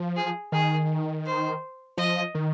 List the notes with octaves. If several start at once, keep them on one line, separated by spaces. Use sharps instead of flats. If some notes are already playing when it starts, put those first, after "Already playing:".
Already playing: F3
G#4
D#3 G#4
C5
F3 D#5
D#3